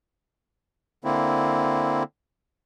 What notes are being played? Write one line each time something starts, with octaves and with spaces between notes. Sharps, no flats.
D3 A#3 C4 E4